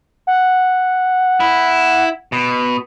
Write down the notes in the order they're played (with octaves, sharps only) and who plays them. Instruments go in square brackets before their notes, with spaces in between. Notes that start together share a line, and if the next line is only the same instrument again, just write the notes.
[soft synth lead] F#5
[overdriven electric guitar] E4
B2